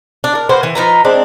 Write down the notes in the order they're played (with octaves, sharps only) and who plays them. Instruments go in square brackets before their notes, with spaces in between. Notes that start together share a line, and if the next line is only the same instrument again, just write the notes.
[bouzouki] D4
A#4
A#3 F#4 B4 C5
E3
F3 D#4 B4 A#5
G#3 C4 D4